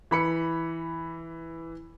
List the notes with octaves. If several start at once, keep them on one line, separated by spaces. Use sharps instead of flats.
E3 B5 C#7